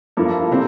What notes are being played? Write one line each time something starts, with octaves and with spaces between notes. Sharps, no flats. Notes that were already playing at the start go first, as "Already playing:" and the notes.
G2 F3 A#3 E4 A4
C3 G3 C4